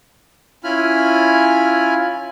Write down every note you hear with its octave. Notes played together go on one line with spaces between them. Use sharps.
C#4 E4 F4 G#5 B5 F6